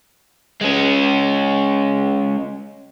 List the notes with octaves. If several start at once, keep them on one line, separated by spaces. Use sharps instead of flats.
G#3 C#4